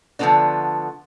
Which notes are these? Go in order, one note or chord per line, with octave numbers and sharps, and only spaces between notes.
D3 F3 F#3 A3 B3 D4